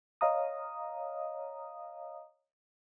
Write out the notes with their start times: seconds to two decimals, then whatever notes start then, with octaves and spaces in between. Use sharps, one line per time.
0.21 C#5 D#5 F5 A#5 D#6